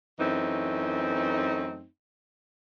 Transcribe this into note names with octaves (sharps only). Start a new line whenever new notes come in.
F#2 E3 A3 C4 D#4